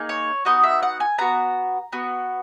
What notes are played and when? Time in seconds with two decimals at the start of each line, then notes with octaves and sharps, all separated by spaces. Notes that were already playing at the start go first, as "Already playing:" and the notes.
Already playing: A#3 D#4 G#4
0.09 C#5
0.45 B3 D#4 F#4 D#5
0.63 E5
0.83 F#5
1.00 G#5
1.18 B3 F#4 A#5
1.93 B3 F#4